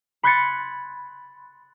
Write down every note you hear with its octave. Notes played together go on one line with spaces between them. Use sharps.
B5 C6 F#6 G#6 A6 C#7